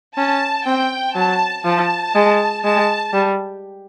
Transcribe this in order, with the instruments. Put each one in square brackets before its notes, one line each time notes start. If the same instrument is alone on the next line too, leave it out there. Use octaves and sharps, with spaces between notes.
[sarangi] C#4 [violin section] A5
[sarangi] C4 [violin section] G5
[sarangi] F#3 [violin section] A5
[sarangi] F3 [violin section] A5
[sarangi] G#3
[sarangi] G#3 [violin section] A5
[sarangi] G3